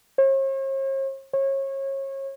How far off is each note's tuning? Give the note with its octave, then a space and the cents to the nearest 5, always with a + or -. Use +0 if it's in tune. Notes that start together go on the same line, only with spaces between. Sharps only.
C#5 -45
C#5 -30